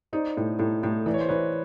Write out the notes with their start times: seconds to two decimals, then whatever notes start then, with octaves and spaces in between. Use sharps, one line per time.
0.13 D#4 C5 D5
0.37 A2
0.59 A2
0.83 A2
1.06 E3 D5
1.14 C#5
1.21 C5
1.29 E3 B4 C#5